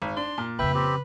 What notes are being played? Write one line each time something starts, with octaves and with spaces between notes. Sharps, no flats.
G#1
D4 C6
A#2
F2 C#3 B4 E5 G5
C4 G4